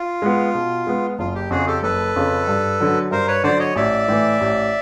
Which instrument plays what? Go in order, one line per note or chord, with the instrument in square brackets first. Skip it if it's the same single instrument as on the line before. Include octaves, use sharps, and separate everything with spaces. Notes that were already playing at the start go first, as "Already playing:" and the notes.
Already playing: [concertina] F4
[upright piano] G#3 B3
B2
G#3 B3
[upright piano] F#1 [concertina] F4
[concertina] G4
[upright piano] F2 C#3 [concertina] F#4 G#4
[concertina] G4 A4
[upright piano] F#1 [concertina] A4 B4
[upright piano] F2 C#3
G2
D3 F#3
[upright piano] G2 [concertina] A#4 C5
[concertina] B4 C#5
[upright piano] D3 F#3 [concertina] C5 D5
[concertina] C#5 D#5
[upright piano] A1 [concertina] D5 E5
[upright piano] A2 E3
A1